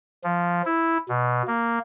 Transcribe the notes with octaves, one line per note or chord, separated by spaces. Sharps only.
F3
E4
B2
A#3